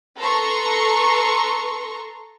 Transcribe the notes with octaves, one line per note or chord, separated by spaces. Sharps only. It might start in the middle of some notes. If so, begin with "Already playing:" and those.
A4 B4 A#5 C6 C#6